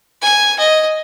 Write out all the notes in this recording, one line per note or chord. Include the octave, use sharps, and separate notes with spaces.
G#5
D#5